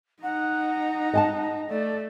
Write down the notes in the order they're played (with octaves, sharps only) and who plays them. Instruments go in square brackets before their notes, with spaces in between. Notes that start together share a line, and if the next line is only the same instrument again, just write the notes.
[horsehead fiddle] D#4 A#5 [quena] F#5
[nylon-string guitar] D#5 G#5 A5
[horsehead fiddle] A3 [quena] D5